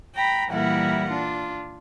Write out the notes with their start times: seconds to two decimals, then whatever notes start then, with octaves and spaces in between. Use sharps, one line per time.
0.14 G5 A#5 B5
0.50 A#2 E3 G3 E4 A#4 F#5
1.09 D4 F4